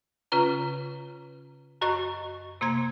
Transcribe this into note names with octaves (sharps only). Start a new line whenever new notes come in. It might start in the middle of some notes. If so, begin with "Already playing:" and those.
C#3 C#4 F4 B4 A#5
F#2 F#4 D#5 C#6
C3 A#3 C6 G#6